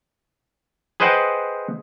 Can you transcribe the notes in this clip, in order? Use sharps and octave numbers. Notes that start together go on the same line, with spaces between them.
G#4 B4 C5 D#5 F#5 G5